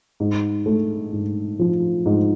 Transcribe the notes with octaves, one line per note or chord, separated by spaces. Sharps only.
G#2
A3
G#2
F3
G#2